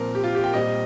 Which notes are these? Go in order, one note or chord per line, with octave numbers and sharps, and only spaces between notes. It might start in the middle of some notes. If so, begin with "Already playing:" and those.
Already playing: A#2 F3 C4 A#4
G4
F4
G4
G5
A#2 G3 C4 D#5